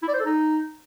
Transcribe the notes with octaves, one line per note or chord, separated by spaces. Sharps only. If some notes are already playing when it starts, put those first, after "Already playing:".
E4
D5
C5
A4
D#4